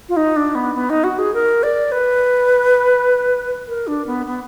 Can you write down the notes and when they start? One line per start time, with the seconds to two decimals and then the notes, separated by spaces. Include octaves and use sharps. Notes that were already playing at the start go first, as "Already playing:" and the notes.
0.09 F4
0.16 D#4
0.36 D4
0.55 B3
0.75 B3
0.90 D#4
1.04 F#4
1.18 G#4
1.34 A#4
1.63 D5
1.92 B4
3.68 A#4
3.87 D4
4.07 B3
4.26 B3